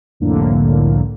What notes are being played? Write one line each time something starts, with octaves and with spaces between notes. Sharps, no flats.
C2 F2 A2 D3 A#3